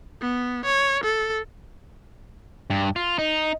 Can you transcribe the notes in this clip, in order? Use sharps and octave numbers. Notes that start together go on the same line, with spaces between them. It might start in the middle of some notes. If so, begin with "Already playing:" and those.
B3
C#5
A4
G2
F4
D#4